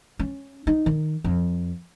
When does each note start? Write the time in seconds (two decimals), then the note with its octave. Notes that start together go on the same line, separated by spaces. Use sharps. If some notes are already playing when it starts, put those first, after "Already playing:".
0.19 C#4
0.67 D#4
0.86 D#3
1.24 F2